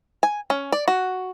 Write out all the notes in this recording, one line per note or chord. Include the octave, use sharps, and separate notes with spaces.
G#5
C#4
D5
F#4